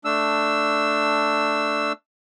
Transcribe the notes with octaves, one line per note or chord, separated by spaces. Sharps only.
A3 D4 E6